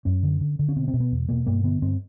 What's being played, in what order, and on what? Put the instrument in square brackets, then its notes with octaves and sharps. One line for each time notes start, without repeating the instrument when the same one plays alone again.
[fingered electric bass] F#2 C#4
D3
D3
D3
C#4
B2 C4
C4
B2
B3
E2
B2 A#3
G2 A#3
D3 B3
G2 C4